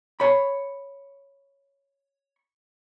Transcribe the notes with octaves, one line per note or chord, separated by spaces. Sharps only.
C#5 B5